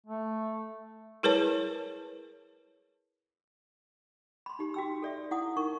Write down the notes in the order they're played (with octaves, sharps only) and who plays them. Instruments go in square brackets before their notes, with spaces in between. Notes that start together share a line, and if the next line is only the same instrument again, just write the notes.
[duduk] A3
[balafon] E4 G#4 A#4 B4 C#5 A5
[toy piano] B5 C6
D#4 G4 B5
F#4 G5 E6
A4 D5 E5
E4 F#5 D#6
D#4 A#4 C#6